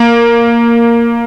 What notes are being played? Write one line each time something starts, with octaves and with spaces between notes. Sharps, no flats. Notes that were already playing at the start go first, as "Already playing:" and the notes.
Already playing: A#3